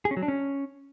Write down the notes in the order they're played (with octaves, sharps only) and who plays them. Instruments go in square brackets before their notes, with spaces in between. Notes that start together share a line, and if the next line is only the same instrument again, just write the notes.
[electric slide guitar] G#4
C#4
F#3
D4
C#4